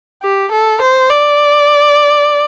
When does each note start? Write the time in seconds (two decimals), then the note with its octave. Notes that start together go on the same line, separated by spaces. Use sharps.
0.23 G4
0.52 A4
0.82 C5
1.10 D5